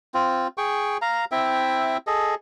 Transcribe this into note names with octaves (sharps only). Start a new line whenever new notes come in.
C4 F4
G#4 G5 C#6
F5 A#5
C4 E4 E5 G5
G#4 A4 D#5